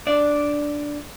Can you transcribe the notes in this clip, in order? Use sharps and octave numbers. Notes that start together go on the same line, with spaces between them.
D4 D5